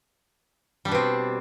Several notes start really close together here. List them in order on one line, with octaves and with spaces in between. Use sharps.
G3 D4 B2 C4